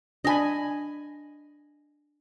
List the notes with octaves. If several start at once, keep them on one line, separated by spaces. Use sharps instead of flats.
D4 D#5 G#5 A5 B5